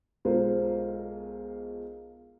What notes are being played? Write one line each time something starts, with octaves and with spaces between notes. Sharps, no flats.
B1 G#3 F4 A#4 C5